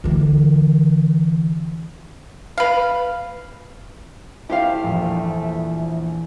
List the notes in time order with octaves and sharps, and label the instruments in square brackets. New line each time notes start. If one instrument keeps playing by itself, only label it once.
[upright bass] D3 E3
[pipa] B4 F5
[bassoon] A3 [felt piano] E4 [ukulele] G4 C5 F5
[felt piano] A#1 [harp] E2 A#2 G3